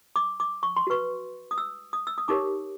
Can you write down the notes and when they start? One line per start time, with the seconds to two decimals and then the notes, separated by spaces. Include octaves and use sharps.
0.16 D6
0.40 D6
0.63 C#6
0.76 C6
0.87 F#4 B4 C#6
1.51 D#6
1.58 E6
1.93 D#6
2.07 E6
2.18 D#6
2.28 D#4 G4 A#4 C#5 D6